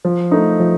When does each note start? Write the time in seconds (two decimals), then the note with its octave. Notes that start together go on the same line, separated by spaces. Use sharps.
0.05 F3
0.31 A3 D#4
0.60 F3